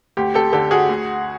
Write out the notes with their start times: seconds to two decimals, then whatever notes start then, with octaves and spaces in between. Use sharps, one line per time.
0.17 D2 G4
0.34 G4 A4
0.53 D3 G4 A4
0.71 F#4 G#4
0.89 D2